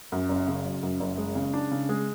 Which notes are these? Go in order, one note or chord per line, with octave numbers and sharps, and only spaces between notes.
F#2
F#1
C#3
F#3
F#2
F#1
G#3
C#3
D4
C#3
G#3